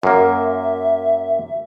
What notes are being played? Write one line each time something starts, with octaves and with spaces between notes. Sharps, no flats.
F#2 A#3 E5